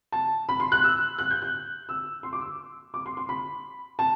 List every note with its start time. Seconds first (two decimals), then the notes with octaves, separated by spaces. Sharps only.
0.12 A5
0.49 B5
0.60 C6
0.72 F#6
0.84 E6
1.18 F#6
1.30 G6
1.42 F#6
1.89 E6
2.23 C6
2.33 D6
2.41 E6
2.94 D6
3.06 C6
3.17 C6
3.29 B5
3.99 A5